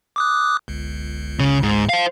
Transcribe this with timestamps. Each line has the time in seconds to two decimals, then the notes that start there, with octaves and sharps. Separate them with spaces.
0.16 D6 D#6 F#6
0.68 G1 C#2
1.39 C#3
1.63 G#2
1.89 C5 F5